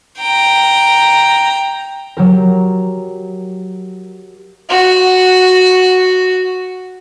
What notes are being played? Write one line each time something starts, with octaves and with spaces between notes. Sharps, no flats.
G5 A#5
F#3 G4 A#4
F#4 F#5